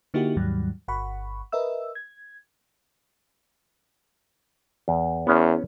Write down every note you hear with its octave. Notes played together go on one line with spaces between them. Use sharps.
D3 A#3 D#4 E4 F#4 G4
D#2 G#2 D#3 F#3 G3
G1 F#5 B5 C#6
A#4 B4 D#5 E5 E6
G#6
E2
E2 B3 C#4 C#5